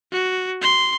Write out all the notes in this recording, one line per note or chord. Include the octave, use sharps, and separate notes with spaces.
F#4
C6